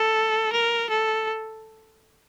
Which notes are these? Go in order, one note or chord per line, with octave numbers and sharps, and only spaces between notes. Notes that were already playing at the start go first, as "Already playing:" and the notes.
Already playing: A4
A#4
A4